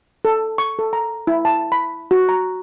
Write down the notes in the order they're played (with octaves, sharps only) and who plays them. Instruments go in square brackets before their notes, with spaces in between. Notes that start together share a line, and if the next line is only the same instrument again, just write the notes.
[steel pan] A4
C#6
A4
A#5
E4
A5
B5
F#4
A#5